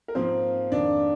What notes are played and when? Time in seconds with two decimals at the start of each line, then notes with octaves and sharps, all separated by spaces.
0.08 A#4
0.15 G#2 F3 A#3 C4 C5
0.71 F2 D#3 A#3 D4 D5